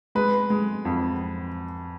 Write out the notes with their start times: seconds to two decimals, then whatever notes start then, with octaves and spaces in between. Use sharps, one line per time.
0.15 G#3 B4
0.50 G#3
0.85 F2